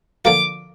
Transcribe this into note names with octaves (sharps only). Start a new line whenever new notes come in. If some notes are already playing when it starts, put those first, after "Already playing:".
D3 F3 A#3 F4 A#4 D6